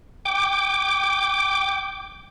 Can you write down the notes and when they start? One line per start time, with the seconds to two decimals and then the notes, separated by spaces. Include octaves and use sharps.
0.25 G5 D6